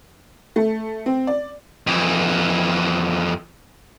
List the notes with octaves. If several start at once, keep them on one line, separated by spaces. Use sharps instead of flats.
A3
C4
D5
F2 E3